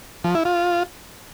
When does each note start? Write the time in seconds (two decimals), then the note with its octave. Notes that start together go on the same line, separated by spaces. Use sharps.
0.24 F3
0.35 E4
0.45 F4